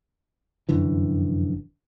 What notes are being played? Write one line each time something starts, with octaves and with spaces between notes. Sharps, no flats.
F1 F#2 D3 E3